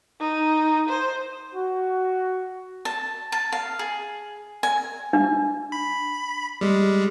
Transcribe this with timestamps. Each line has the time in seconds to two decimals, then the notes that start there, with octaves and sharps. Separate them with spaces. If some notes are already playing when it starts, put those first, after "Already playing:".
0.20 D#4
0.89 C5
1.53 F#4
2.85 A5
3.32 A5
3.52 F5
3.79 G#4
4.63 G#5
5.13 D4
5.72 B5
6.61 G3 G#3